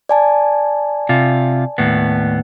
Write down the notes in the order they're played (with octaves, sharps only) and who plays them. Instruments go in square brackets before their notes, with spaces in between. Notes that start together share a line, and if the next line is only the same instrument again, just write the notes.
[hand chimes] D5 G#5 A5
[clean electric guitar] C3 F4
D#2 A2 B3